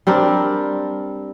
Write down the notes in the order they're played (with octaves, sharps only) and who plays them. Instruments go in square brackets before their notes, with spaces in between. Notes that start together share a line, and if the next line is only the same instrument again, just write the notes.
[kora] G3 C4 D4 A#4